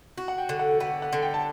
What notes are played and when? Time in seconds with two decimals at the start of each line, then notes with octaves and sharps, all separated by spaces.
0.18 F#4
0.28 F#5
0.38 G5
0.49 D3
0.59 F#5
0.80 B3 F#5
1.02 F#5
1.13 D3
1.22 G5
1.34 A5